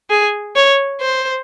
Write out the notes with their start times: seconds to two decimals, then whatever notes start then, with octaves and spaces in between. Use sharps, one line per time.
0.10 G#4
0.55 C#5
1.01 C5